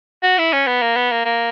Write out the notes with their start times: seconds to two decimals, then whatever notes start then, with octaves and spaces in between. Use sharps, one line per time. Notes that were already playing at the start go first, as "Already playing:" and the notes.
0.23 F#4
0.38 E4
0.53 C#4
0.67 B3
0.81 A#3
0.96 B3
1.11 A#3
1.25 A#3